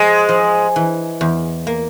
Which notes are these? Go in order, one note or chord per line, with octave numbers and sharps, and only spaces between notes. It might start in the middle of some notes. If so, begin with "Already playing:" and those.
Already playing: F3 G#3
F3
E3
E2
A#3